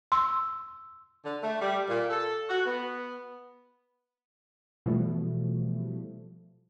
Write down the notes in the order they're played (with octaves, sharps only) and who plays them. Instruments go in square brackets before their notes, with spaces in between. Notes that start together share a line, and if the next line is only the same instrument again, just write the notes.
[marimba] C6 [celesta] E6
[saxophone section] D3
A3
G3
A#2
A4
F#4
B3
[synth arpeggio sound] B2 E3 F3 G3 A3